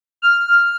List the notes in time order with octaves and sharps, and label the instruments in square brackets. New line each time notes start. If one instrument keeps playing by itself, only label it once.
[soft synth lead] F6